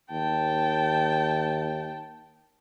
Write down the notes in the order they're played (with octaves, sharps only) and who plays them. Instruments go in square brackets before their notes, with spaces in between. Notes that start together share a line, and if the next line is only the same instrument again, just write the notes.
[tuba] D#2 [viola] G5 A5